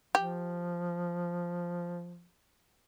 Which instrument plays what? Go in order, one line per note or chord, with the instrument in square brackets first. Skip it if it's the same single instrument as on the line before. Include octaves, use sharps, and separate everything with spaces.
[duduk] F3 [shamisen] G4